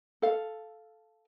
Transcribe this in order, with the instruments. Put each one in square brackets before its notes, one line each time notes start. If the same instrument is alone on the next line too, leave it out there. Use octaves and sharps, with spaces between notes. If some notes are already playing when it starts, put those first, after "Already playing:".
[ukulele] A4 F5